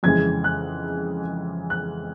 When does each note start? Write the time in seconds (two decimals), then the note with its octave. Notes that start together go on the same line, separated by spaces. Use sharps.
0.03 F2 C#3 E3 G#3 G#6
0.44 F#6
1.70 F#6